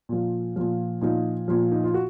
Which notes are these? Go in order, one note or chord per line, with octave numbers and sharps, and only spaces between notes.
A#2 F3
A#2 F3
A#2 F3 D#4
A#2 F3
D#4
F4
F#4